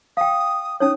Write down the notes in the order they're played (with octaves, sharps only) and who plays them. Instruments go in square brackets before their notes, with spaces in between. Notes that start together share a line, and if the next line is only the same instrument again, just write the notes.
[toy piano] F5 G5 [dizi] D#6
[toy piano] C#4 D#4 C#5 [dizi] D#6